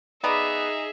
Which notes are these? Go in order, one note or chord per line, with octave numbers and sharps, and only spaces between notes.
B3 D#4 G#4 D5 E5 A#5